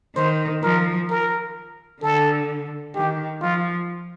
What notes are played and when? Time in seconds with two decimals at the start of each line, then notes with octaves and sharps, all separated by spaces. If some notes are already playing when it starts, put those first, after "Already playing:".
0.16 D#3 C5
0.63 F3 A#4
1.10 A#4
2.03 D3 A4
2.95 D#3 G4
3.42 F3 F4